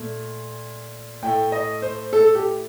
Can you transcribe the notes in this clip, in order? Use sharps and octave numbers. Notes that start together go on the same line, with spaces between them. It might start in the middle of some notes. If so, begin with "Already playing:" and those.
Already playing: A#2 A3
A2 A3 G5
D#5
C5
A4
G4